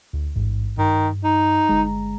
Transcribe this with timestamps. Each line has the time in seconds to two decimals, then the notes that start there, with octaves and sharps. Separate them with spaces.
0.13 D2
0.36 A1 G#2
0.78 G2 D#3
1.24 D#4
1.68 G1 G#3 A#5